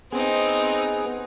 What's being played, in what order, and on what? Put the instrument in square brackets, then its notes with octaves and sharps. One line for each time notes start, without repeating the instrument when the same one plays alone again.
[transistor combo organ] B3 G#4 [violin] C4 D#4